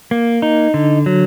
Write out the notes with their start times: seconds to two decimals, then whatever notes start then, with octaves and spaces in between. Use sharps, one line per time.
0.11 A#3
0.42 D#4
0.74 D3
1.06 F#3